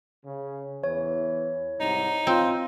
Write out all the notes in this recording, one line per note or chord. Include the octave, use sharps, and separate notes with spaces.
C#3
E2 E3 C#5
C2 G#2 D#4
C4 F4